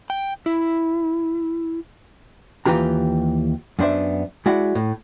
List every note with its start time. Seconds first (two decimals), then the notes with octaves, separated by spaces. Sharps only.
0.10 G5
0.46 E4
2.66 D#2 C#3 E3 F4 G4 A#5
3.79 F#2 B3 D4 C5 D5 E5
4.46 G#3 E4 F#4 D5 F#5
4.75 A2